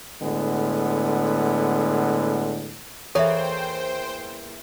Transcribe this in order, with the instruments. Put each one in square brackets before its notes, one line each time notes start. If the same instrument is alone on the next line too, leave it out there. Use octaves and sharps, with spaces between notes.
[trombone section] A2 D3 G#3 B3
[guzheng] E2 E3 A#3 [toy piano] A4 E5 [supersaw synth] C5 G5 [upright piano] C#5